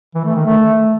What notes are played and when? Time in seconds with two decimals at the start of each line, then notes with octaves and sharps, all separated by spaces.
0.15 E3
0.25 A3
0.35 D#3
0.46 A3